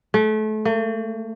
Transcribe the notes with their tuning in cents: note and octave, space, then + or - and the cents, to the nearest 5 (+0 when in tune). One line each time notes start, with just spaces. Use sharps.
A3 -30
A3 +45